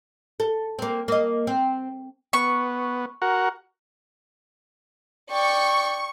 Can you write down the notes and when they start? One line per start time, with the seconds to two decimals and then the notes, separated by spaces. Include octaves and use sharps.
0.40 A4
0.79 A#3 C4
1.08 A#3 D#5
1.47 C4
2.33 B3 C#6
3.22 F#4 A#4 F#5
5.32 D5 G5 C#6